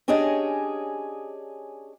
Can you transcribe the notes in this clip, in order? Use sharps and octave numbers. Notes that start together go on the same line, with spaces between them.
C#4 D4 G4 G#4 C#5 D#5